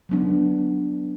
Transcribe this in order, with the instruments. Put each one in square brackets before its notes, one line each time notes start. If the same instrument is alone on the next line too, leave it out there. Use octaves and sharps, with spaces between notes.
[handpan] F#3 B3 D4